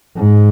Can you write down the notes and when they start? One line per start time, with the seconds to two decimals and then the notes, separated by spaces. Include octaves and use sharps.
0.17 G#2